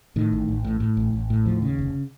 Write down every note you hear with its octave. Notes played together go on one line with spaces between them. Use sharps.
A2 D#3
A1
A1
A2
A2
A1
A1
A2
D#2 F3
C#3
F1